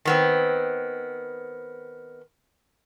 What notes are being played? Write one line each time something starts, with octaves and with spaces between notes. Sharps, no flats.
D#3 B3 C4